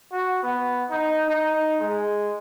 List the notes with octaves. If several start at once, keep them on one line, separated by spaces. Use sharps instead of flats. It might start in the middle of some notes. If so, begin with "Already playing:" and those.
F#4
B3
D#4
D#4
G#3